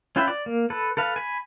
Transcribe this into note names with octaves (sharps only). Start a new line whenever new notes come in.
C#4 F4 B4 E5 G5
D5
A#3
A4 B4
A4 B4 F5
G#5 B5